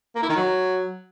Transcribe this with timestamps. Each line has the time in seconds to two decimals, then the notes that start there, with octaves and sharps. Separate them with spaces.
0.16 A#3
0.22 E4
0.29 D#3
0.36 F#3